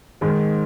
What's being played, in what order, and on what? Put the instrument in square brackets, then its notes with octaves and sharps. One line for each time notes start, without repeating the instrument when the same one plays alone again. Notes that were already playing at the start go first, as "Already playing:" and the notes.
[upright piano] G#2 D#3 G#3